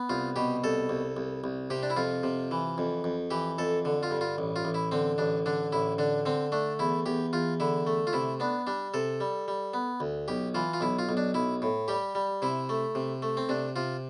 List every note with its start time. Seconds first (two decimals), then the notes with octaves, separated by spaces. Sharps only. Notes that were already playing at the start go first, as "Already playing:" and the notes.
Already playing: B3
0.09 C2 F4
0.36 B2 G4
0.64 C2 A4
0.89 C2
1.17 C2
1.44 C2
1.70 C3 G4
1.83 D4
1.90 E4
1.97 F2 F4
2.23 C3
2.51 E3
2.78 F2
3.04 F2
3.31 E3 G4
3.58 F2 A4
3.85 D3
4.03 F4
4.11 G2
4.21 F4
4.38 A1
4.56 F4
4.65 A1
4.74 E4
4.92 D3 C4
5.18 A1 D4
5.46 D3 D4
5.72 A1 E4
5.98 D3 D4
6.26 D3 C4
6.52 A3 D4
6.79 E2 E4
7.06 E2 G4
7.33 E2 F4
7.60 D3 E4
7.87 A3
8.07 F4
8.13 C3 E4
8.40 B3 D4
8.67 G3 D4
8.94 C3 A4
9.21 G3
9.48 G3
9.74 B3
10.00 D2
10.28 B1 G4
10.55 E3 F4
10.74 F4
10.81 B1 E4
10.99 F4
11.09 B1
11.17 D4
11.34 B1 E4
11.62 A2
11.88 G3 G4
12.15 G3
12.42 C3 E4
12.69 A3
12.95 C3
13.22 A3
13.37 C4
13.49 C3 D4
13.76 C3 F4